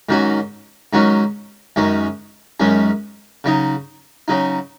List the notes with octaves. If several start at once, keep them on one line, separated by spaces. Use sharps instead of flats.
G#2 D#3 F#3 C#4 F#4
G#2 D#3 F#3 C#4 F#4
F#2 D#3 G#3 C#4
F#2 D#3 G#3 C#4
C#3 F#3 D#4
C#3 F#3 D#4